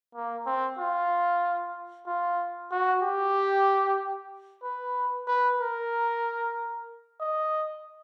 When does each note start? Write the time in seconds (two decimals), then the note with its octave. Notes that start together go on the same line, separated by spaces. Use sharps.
0.15 A#3
0.46 C4
0.79 F4
2.07 F4
2.72 F#4
3.03 G4
4.63 B4
5.28 B4
5.60 A#4
7.20 D#5